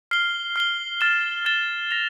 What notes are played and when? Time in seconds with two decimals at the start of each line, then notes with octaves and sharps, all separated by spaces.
0.11 F6 C7 G7
0.56 F6 C7 G7
1.01 F6 A6 E7 G7
1.45 F6 A6 E7 G7
1.91 A#6 F7